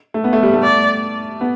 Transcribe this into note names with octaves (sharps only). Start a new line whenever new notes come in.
A3
B3
A3
G3
A3
D5
B3